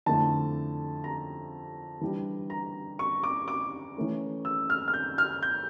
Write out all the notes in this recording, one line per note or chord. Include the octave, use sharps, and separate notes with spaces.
F2 D3 A3 E4 A5
A#5
E3 G3 D4
A#5
C#6
D6
D6
E3 A3 C#4
E6
F6
F6
G6
F6
G6